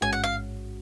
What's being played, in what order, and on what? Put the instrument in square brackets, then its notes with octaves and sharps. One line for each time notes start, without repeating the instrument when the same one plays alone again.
[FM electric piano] A1 G#2 G#3 C#4 F#4 [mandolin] G#5
[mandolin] F#5
F5